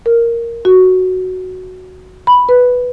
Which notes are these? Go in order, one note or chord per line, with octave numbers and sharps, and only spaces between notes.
A#4
F#4
B5
B4